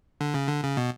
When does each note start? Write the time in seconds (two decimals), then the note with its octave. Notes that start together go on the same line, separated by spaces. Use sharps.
0.21 D3
0.34 C#3
0.48 D3
0.64 C#3
0.77 B2